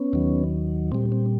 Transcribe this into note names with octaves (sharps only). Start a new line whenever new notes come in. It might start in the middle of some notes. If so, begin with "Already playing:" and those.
Already playing: B3 C#4
D#2 D#3 F#3
A#2 G3 C4
C4